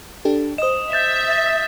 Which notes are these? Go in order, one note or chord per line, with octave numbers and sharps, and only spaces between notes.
D4 G4 A4
C5 D#5 D#6 E7
E5 G6 A6 E7
A6